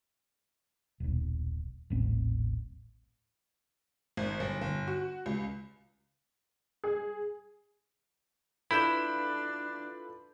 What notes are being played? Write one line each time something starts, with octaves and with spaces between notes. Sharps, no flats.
D#1 B1
D#1 A1 C4
G#1
G1
G1
F#4
C#2
G#4
D4 E4 F4 A4 B4 B5 G6 E7